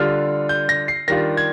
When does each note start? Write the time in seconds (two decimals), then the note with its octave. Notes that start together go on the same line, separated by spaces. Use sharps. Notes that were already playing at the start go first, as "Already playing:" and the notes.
Already playing: D3 G3 D4 F4 F6
0.49 G6
0.69 A#6
0.88 C7
1.08 D#3 G3 D4 F4 A#6
1.37 G#6